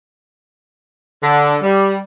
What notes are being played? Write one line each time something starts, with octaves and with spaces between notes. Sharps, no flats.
D3
G3